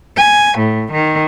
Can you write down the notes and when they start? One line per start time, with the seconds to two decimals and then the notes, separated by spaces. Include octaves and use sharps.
0.16 G#5
0.56 A2
0.93 D#3